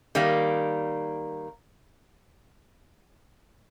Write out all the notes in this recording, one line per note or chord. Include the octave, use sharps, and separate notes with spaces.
D#3 G3 A#3